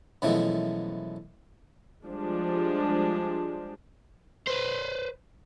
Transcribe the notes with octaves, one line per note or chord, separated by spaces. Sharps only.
F#2 B2 E3 F3 G#3 A3
F3 G3 G#3 D4
B4 C5